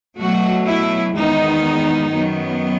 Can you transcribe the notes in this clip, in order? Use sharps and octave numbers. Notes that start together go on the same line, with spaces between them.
B2 F#3 A3 F#4
E4
E2 D#3 G#3 B3 D#4
F#2 D#3 F#3 B3